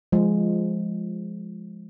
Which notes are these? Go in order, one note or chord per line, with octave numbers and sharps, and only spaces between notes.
F3 G#3